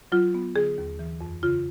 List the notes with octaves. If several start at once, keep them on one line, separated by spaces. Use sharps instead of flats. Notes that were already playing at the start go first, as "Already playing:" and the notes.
F#3 F4
B3
D3 G#4
D#2
E3
F2
C#3 F4